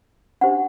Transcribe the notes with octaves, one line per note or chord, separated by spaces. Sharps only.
D4 G4 C5 F#5